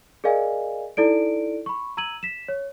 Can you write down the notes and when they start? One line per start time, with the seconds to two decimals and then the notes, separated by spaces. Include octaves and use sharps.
0.24 G#4 A#4 D5 D#5 F5 G#5
0.97 D#4 E4 A4 D5 D7
1.66 B5 C#6
1.97 A#5 E6 G#6 D#7 F#7
2.23 B6 E7
2.48 C#5